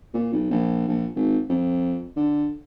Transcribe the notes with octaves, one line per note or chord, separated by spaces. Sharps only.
A#2
B1
A#1
A#1
G#1
F2
D3